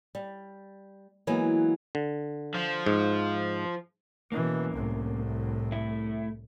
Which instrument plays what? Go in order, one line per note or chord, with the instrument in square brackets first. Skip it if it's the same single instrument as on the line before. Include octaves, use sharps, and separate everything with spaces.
[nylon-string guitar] G3
E3 F#3 G#3 A#3 B3
[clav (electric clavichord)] D3
[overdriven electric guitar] F3
[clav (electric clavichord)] G#2
[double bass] B2 E3 [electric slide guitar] A#3 C#4
[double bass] C2 A2
[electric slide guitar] A3 E4